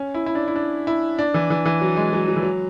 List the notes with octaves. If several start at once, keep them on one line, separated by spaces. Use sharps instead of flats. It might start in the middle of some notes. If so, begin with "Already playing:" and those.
Already playing: C#4
E4
E4
D4
E4
D4
E4
D4
E3
E3
E3
F#3
G#3
F#3
F#3
E3
F#3